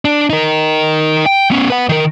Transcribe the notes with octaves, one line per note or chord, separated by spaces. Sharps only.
D4
D#4 A#4
G5
B3 C#4
B4 F#5
D#3 A#4